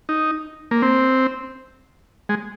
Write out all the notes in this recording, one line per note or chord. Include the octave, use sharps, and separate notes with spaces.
D#4
A#3
C4
G#3